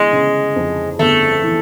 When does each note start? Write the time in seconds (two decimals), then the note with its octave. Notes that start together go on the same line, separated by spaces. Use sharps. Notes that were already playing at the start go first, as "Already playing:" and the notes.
Already playing: G1 E3 G#3
0.13 C#3
0.56 F2
0.99 G1 A3
1.43 E3